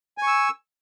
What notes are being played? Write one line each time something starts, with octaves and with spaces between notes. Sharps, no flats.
G#5 C#6 E6